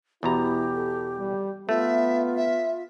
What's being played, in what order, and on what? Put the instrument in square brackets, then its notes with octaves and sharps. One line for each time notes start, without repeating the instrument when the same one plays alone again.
[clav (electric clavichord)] E2 B2 A#5 [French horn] E4 [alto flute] G4
[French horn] A4
G3
[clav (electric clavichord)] A3 [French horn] B3 [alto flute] F4 [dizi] E5
[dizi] E5